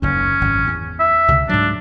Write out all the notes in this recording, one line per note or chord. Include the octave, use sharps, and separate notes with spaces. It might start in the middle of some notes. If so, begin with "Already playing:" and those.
F#1 D#2 C#4
G#1 F#2
E2
E5
C#2 C3
G#2 F#3 D4